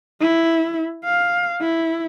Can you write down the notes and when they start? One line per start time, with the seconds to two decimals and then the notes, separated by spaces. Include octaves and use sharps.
0.21 E4
1.05 F5
1.60 E4